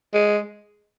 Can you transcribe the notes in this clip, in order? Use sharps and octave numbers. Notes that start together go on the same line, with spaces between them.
G#3